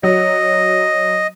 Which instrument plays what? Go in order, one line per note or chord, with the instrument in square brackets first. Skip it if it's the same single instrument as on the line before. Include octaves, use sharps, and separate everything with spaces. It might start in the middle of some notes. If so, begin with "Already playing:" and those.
[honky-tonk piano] F#3 [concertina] D#5